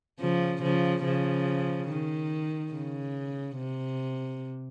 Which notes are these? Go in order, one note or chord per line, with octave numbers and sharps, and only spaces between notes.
C#3 F3
C#3 F3
C#3 F3
D#3
C#3
C3